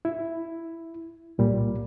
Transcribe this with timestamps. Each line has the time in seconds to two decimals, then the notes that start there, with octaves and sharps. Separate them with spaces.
0.05 E4
1.38 C2 A#2 G3